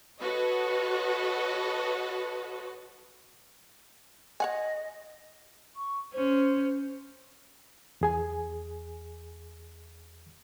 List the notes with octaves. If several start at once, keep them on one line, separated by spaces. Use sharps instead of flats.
F#4 A4 B4 C#5 D#5
C#5 D#5 F#5 G#5
C#6
C#4 C5
E2 G#4 G#5